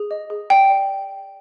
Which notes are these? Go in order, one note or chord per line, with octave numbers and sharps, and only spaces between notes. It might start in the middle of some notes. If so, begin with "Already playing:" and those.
Already playing: G#4
D#5
G#4
D5 G5
D5